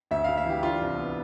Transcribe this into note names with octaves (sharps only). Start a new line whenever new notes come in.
D2 E5
D2 F5
E5
E3 G4
D4 F4
C2
B3